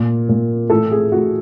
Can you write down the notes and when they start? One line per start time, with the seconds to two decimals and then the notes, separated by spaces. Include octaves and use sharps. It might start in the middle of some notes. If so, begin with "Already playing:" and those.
Already playing: A#2
0.29 A#2
0.70 A2 E3 A4
0.92 G#4
1.12 A2 E3 F#4